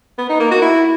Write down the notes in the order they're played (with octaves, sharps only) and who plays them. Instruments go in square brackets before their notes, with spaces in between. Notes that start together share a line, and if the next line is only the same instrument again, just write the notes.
[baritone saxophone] B3
D#4
A#3
F#4
E4